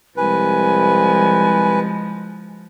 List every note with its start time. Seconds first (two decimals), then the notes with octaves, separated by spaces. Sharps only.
0.17 C2 F3 G#3 B4 G#5